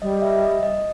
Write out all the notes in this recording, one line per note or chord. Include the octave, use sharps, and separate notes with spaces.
G3 D#5
E5
D#5
D#5